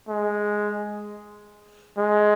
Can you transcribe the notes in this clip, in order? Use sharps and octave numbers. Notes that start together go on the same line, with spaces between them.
G#3
G#3